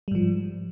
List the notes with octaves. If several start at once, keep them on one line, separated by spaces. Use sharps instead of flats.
G#2 F3 G3